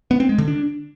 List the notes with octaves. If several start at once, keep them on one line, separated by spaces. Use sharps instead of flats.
B3
C4
G#3
D3
D4